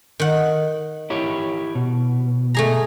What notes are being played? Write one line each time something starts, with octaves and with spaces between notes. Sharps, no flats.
D#3 F#5
E4 G4 C#5
B2
A3 G#4 A#5